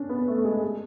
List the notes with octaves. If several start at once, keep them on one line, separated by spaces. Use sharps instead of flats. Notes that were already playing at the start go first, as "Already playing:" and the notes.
Already playing: C#4 D4
B3
A3
G#3
G#3